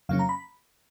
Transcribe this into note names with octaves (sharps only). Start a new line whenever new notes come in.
F2 C#3 F#3 A#3 C#4 F5
A#5
B5